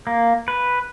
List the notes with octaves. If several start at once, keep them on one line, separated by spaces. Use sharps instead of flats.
A#3
B4